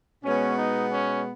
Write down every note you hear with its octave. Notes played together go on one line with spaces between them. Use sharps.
B2 G#3 B3 C#4
D#4
C#4